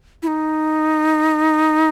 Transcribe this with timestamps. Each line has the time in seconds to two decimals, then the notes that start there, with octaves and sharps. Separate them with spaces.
0.23 E4
0.27 D#4